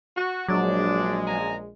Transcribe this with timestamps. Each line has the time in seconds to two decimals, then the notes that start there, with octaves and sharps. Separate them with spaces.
0.17 F#4
0.48 A#1 F#3 G#3 D4 D5
1.27 F#2 G#5 A#5